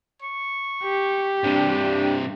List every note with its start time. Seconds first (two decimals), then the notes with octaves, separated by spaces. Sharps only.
0.22 C#6
0.84 G4
1.44 G2 C3 D4